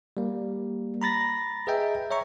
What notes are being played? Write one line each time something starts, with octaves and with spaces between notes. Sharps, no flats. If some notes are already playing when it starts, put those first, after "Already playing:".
G3 A#3
A#5 B5 A6 A#6
G#4 B4 D#5 E5 G5 A#5
C#5 E5 A#5 C#6